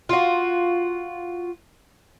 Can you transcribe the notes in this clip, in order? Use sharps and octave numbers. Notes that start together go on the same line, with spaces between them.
F4 F#4